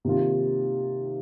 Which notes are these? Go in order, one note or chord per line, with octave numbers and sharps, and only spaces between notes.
C3 D#3 A#3 F4